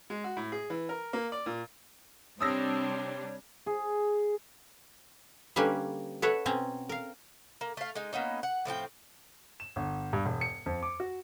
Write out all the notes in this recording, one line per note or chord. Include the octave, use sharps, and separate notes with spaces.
G#3
F#4
A2
G#4
E3
A#4
A#3
D5
A#2
C3 G3 C4 D4 C#5 D#6 E6 A#6
G#4
D3 G3 A#3 C#4 B4
A4 B4 C#5 E5 F#5
B2 C4 C#4 A#5
A#4 F5
A#3
A3 F5
G#3 D#4
A#3 B3 C#4 D#4
F#5
A2 F3 C4 G5
E7
G1
G2
E1
C#7
F2
D6
F#4